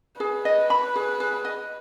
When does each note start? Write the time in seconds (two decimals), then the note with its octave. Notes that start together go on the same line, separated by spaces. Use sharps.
0.20 G#4 B4
0.45 D#5
0.70 B5
0.96 G#4
1.20 G#4
1.45 D#5